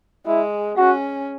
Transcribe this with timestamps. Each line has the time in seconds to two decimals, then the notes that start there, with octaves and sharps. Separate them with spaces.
0.26 G#3 E4
0.77 C#4 F#4